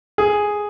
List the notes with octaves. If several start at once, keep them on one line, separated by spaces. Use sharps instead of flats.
G#4